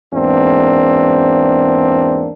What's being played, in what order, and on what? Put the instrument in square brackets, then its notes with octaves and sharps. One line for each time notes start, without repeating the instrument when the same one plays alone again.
[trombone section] E2 G#2 A#3 C4 D4